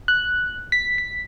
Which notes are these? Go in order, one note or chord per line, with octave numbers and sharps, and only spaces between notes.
F#6
B6
B6